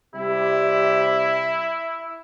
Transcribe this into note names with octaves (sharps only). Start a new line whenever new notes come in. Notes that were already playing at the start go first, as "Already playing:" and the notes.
C3 G3 E4 G4